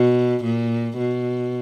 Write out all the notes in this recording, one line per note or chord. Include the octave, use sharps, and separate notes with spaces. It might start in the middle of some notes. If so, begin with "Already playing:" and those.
Already playing: B2
A#2
B2